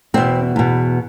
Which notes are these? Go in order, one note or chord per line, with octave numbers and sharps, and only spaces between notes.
E2 B2 C4
E2 B2